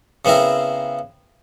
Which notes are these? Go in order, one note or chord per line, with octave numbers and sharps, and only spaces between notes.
C#3 B3 C4 E4 A#4